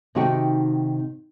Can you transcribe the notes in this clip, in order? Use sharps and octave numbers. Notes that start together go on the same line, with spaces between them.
C3 D#3 D#4 F#4 A4 G5